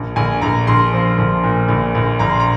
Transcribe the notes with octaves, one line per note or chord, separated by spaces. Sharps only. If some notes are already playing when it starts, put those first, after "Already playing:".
Already playing: A#1
A#1 G#5
A#1 A#5
A#1 C6
F3
A#1
A#2
A#1
A#1
A#1 A#5
C6
A#5